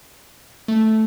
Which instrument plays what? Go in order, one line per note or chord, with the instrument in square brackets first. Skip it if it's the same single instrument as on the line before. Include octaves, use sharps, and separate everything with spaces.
[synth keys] A3